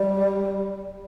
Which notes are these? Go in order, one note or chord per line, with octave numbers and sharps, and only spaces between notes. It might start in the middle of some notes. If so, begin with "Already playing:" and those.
Already playing: G3